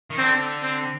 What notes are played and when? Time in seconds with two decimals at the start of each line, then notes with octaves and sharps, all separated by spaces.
0.10 D#3
0.18 D3 C4
0.63 C4